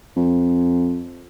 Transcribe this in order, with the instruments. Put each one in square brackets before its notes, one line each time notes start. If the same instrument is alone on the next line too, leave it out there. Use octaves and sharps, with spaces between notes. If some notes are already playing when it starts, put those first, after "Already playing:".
[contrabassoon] F2